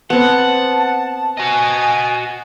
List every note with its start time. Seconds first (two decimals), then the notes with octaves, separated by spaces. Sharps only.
0.10 B3 C4 F#5 A5
1.38 F#4 D#5 G#5